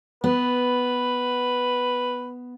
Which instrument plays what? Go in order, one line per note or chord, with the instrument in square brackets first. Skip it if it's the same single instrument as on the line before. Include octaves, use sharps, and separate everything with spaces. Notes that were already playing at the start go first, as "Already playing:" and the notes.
[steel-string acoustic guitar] B3 [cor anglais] B4